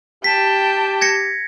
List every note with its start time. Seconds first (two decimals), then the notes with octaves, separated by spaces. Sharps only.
0.24 G4 G5 A5 B6
1.01 G#6 A#6 C#7